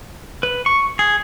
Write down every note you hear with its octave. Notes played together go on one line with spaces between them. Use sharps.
B4
C#6
G#4